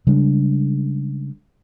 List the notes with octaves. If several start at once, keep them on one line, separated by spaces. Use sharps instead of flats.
C#3 G3 G#3 D4